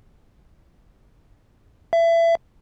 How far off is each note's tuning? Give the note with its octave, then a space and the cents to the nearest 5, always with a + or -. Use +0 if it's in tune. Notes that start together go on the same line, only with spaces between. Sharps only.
E5 +25